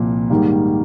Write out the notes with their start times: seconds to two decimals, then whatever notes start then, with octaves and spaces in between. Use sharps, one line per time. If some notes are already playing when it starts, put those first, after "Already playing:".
Already playing: C2 A#2 F3
0.30 G#2 D#3 G3 A#3